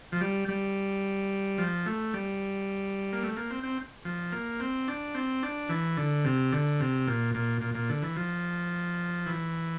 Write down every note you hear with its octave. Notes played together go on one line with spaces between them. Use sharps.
F3
G3
G3
F3
A3
G3
A#3
A3
A#3
C4
C4
F3
A#3
C4
D4
C4
D4
E3
D3
C3
D3
C3
A#2
A#2
A#2
A#2
D3
E3
F3
E3